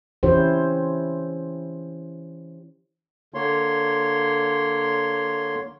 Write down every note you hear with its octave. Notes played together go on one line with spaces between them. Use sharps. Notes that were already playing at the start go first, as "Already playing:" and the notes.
E3 C#4 E4 G4 C5 C#5
D3 A#3 C#5 C6